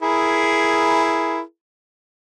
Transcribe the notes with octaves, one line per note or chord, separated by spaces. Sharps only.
E4 G#4 A#4